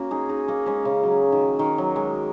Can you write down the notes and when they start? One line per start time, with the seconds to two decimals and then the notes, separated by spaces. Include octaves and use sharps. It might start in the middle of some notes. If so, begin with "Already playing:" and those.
Already playing: A#3 C#4 F#4
0.11 D#4 G#4
0.29 D#4 G#4
0.48 A#3 D#4
0.66 G#3 C#4
0.85 C#3
1.03 F#3
1.32 D#3
1.59 D#3
1.78 F#3
1.96 G#3